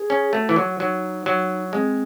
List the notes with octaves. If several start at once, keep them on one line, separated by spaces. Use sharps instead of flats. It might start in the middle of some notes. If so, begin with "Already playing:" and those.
Already playing: G#4
C#4
A3 F#4
E3
F#3
F#3 D#4
F#3
G#3 C4